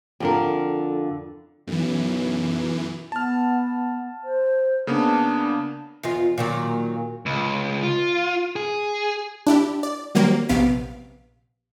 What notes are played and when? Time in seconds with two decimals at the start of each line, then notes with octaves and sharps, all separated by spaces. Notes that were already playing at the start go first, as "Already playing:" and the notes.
0.20 F2 D3 A#4
1.67 B1 F#2 E3
3.12 B3 A5 F6
4.23 C5
4.87 C#3 A#3 B3 D4
6.03 E2 D#4 F4
6.38 A#2 D#3 F#3
7.26 C#2
7.83 F4
8.56 G#4
9.47 D4 E4 G4
9.83 D5
10.15 D#3 F#3 G3 A#3 C4
10.49 A#1 C3 B3 F5 B6 D7